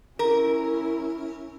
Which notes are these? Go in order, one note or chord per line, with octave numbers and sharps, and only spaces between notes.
C#4 E4 A#4